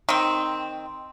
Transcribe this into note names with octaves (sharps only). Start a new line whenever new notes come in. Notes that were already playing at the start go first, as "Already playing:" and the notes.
D#3 C4